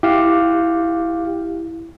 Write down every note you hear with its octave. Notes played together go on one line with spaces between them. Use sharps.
E4 G4 F5